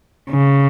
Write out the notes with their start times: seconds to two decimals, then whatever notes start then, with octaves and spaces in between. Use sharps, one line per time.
0.30 C#3